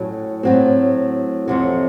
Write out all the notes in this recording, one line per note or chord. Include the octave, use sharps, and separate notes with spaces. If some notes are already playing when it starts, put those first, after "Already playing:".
Already playing: A2 F#3 C#4
A2 F#3 C4
F2 C3 F#3